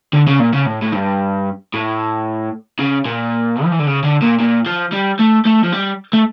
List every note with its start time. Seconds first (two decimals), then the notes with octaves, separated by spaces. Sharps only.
0.13 D3
0.27 C#3
0.40 A#2
0.53 C#3
0.66 A2
0.82 A2
0.93 G2
1.74 A2
2.79 C#3
3.06 A#2
3.64 F3
3.71 E3
3.79 D3
3.87 C#3
4.04 D3
4.22 A#2
4.40 A#2
4.66 F3
4.93 G3
5.19 A3
5.46 A3
5.64 F3
5.73 G3
6.13 A3